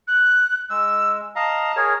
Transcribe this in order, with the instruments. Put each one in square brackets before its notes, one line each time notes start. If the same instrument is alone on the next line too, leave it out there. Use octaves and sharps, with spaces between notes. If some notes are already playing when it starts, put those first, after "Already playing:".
[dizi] F#6
[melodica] G#3 [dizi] E6
[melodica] D#5 F5 A#5 [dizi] A5
[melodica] G#4 A#4 C#5